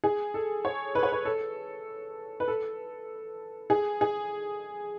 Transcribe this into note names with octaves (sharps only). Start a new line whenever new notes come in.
G#4
A4
C#5
B4
C#5
B4
A4
B4
A4
G#4
G#4